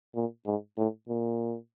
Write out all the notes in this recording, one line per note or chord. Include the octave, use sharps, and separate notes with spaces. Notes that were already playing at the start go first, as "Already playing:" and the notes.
A#2
G#2
A2
A#2